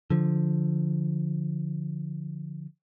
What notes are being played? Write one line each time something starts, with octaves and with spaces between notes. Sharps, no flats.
D3 F3